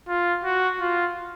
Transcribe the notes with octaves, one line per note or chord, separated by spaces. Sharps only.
F4
F#4
F4